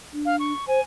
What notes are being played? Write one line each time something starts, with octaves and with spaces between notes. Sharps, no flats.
D4
F5
C#6
C5 G#5